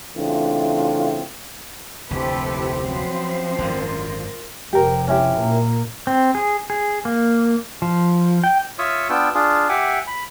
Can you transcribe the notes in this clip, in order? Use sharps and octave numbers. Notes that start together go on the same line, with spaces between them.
C#3 E3 A3 C4 D4 F4
F1 D2 C4 E4 G4 A4 B4 C5
F3 F#3 C#4 B4 C5
G#1 F#2 D3 F4 A#4
F1 C3 G4 A#4
C#4 E4 G4
A#2 A#3
C4
G#4
G#4
A#3
F3
G5
F4 C#5 E5 C#6 D#6 E6
B3 D4 F4 G5 E6
D4 F4 G#4
G4 E5 F#5 G#5 D6
B5